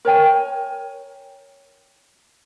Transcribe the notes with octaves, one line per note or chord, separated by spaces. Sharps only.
A#4 C#5 G5 G#5